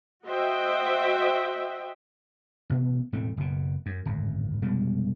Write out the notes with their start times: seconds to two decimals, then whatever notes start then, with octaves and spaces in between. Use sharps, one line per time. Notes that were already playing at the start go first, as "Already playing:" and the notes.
0.25 F#4 C5 D#5 E5 G5
2.70 A1 B2 B3
3.12 E1 A2 A3 C4
3.37 F#1 B2
3.86 F#2
4.05 D1 G#1 F#2
4.62 F1 B2 G3 G#3